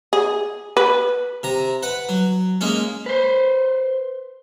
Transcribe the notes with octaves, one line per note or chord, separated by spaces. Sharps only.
G#4
B4
C3 A#5
B4 F#5
F#3
G#3 A#3 C#4
B4 C5